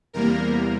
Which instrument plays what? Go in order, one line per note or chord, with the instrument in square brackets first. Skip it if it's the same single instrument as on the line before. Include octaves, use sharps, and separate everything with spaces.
[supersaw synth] E2 C3 G3 A#3 A#4